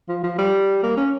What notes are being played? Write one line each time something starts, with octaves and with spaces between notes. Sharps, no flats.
F3
F3
G3
A#3
C#4